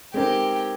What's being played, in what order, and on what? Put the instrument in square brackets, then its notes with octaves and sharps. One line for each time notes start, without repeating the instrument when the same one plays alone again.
[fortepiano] G#3 C4 D#4 A#4 [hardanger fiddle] G4